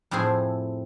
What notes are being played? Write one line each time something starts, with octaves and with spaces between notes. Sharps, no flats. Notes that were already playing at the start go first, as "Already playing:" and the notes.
F2 A2 C4 E4 G#4 C5